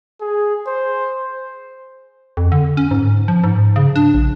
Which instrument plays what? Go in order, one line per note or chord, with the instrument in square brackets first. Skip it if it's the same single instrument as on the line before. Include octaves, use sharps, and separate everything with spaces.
[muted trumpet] G#4
C5
[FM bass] F2
D3
C#4
G#2
F3
G#2
C#3
D4
A#1